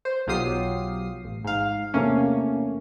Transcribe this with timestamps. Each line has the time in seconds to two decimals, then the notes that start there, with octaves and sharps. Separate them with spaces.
0.05 C5
0.27 B1 F#3 F4 G4 D#6 C7
1.24 A1
1.44 G#2 F5
1.94 E2 C3 A3 A#3 C#4